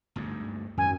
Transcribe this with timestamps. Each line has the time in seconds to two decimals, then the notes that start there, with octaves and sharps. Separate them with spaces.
0.16 G1 D2 G#2
0.78 G#1 F#2 G#5